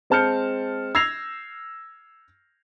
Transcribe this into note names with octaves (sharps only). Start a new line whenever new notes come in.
G#3 C4 A5 F6 G6 C#7
E6 G#6 A#6 C7 F7